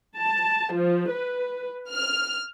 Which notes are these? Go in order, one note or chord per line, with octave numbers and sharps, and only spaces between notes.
A5
F3
B4
F6